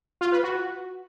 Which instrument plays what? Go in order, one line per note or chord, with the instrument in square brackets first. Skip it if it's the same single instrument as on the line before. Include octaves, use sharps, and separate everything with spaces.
[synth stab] F4
B4
F#4